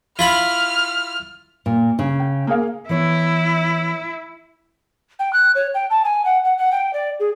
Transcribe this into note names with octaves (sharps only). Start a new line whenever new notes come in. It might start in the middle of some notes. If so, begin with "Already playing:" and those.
E4 F4 B5 F6
A#2
C#3
G5
A#3 G#4 F5
E3 B3 E4 C#5
G5
F#6
C#5
G5
A5
G#5
F#5
F#5
F#5
G5
D5
G#4